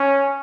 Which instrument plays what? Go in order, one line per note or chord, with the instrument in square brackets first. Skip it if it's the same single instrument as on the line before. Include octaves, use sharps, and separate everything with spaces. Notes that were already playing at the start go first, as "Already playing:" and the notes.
Already playing: [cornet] C#4